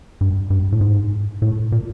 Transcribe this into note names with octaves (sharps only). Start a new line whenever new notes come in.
G2
G2
A2
G#2
A2
A#2